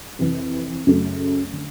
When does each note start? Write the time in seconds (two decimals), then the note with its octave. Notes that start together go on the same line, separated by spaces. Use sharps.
0.19 F2 C3 E3
0.87 F#2 C#3 F#3 A3 C#4
1.53 D3